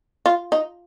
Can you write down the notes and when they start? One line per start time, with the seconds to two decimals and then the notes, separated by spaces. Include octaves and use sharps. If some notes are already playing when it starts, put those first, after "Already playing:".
0.26 F4
0.52 D#4